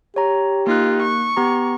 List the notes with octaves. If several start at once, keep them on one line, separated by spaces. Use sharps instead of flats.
G4 C#5 A#5
A#3 D#4 F4 F#6
C#6
B3 G4 A#5